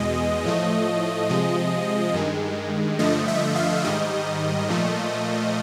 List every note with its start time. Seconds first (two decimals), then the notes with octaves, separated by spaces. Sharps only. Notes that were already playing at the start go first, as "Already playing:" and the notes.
Already playing: E2 B2 G#3 D#5
0.44 A2 F3 A3
1.30 C3 F3 G#3
2.14 G2 D#3 G#3
2.99 G2 D3 F3 A3 D#5
3.28 E5
3.56 F5
3.84 G#2 D#3 G3 D#5
4.69 A#2 F3 A3